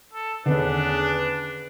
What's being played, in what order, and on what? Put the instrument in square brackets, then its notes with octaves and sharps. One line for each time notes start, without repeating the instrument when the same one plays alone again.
[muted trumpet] A4
[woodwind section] E2 G#4 B4 [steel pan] D3 D#3 C#4 [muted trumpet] D4